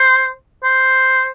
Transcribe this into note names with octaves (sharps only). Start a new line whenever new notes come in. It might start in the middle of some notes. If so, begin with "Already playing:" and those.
Already playing: C5
C5